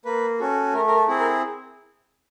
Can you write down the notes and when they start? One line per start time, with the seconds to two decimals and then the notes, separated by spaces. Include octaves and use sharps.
0.05 A#3 B4
0.40 C#4 F#4 A4
0.73 A3 A#4
0.88 A#4
0.97 A4
1.08 C4 E4 G#4
1.20 A#4